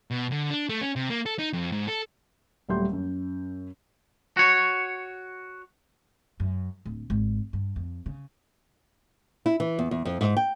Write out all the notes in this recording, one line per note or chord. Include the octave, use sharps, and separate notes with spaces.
B2
D3
D4
A3
C#4
C3
A#3
A4
D#4
F2
G#2
A4
D#1 F#3 G3 A3 C6 G6
F#2
F#4 C#5
F#2
D1
G#1
G2
F2
C#3
E4
E3
E2
E2
F2
G#2
G5